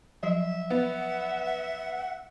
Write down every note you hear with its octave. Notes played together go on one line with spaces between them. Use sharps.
F3 F#3 D#5 E5
B3 F#5
F#5